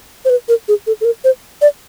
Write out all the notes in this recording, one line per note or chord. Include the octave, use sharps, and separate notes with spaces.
C5
B4
A#4
G#4
A4
A4
A#4
C5
D5